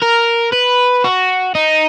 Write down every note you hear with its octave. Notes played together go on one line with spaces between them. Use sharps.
A#4
B4
F#4
D#4